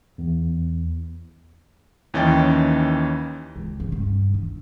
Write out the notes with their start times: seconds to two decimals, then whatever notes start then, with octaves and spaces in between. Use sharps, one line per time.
0.18 E2
2.14 D#2 E3 C#4 D#4 G5 A6
3.56 C#2
3.80 C#3
3.92 G2
4.34 D3